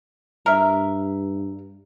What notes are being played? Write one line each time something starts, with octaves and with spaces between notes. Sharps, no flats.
G2 A#4 E5